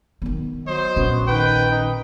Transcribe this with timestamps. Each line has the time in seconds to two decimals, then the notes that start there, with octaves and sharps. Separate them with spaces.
0.22 D#3 B3
0.67 F#3 C5 D#5
0.96 A#1 B3 C#4 F#4
1.28 D#3 B4 G5
1.71 D#4